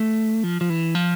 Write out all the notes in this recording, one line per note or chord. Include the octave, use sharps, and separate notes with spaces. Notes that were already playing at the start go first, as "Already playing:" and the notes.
Already playing: A3
F3
F3
E3
F3